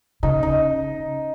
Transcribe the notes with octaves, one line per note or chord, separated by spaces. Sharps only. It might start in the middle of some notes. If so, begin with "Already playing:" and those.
C#3 D#4
D#4